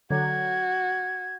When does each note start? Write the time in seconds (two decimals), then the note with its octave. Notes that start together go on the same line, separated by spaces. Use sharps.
0.11 D3 F#3 F#4 G#6